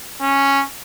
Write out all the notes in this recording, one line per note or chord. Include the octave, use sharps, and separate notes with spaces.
C#4